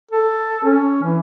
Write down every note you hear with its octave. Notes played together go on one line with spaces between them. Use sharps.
A4
C#4
E3